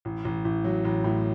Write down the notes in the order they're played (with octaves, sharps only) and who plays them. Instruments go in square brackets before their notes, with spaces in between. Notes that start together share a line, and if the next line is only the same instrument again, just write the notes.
[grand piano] A1
A1
A1
F#3
A1
A2